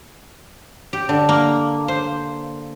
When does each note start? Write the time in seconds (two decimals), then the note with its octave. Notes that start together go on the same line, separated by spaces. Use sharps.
0.93 G4
1.09 D3
1.29 A#3
1.88 C5